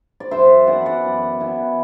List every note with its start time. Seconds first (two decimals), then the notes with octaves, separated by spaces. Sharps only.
0.20 D5
0.31 F#2 C5 E5
0.67 E3 B3 E4 D5 F#5
0.86 D5 F#5
1.04 F#2
1.40 E3 B3 E4